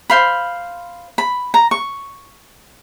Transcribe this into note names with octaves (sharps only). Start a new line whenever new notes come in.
C5 F5 B5
B5
A#5
C#6